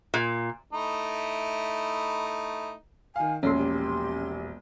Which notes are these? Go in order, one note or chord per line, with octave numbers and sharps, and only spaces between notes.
A#2
A3 D#4 E4
D#3 F5 G#5
E1 A#1 C#4 A4 C6
G4